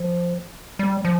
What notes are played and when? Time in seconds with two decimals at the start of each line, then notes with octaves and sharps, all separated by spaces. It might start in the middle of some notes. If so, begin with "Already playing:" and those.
Already playing: F3
0.79 G3
1.05 F3